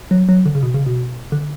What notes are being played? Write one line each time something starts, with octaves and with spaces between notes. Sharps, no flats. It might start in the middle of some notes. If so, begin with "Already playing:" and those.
F#3
F#3
D3
C#3
B2
C#3
B2
D3